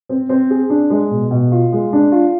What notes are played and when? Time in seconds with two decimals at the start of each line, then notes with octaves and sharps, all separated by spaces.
0.09 C4
0.29 C4
0.50 G#4
0.70 D4
0.90 G#3
1.10 B2
1.31 B2
1.52 F4
1.72 G#3
1.93 D4
2.12 F4